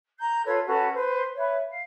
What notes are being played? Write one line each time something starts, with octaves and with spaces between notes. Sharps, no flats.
A#5 G6
F4 A4 B4 C#5
C#4 F#4 A4 B4
B4 C5
B4 C#5 E5
F5